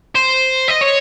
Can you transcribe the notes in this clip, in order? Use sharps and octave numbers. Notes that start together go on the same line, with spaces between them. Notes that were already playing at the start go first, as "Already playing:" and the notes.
C5
D#5
C#5